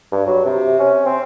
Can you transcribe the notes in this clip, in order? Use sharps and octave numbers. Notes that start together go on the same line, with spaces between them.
G2
F#3
C3
C#4
C4